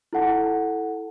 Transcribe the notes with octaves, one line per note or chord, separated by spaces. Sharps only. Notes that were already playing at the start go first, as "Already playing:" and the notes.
E4 A4 F#5 A5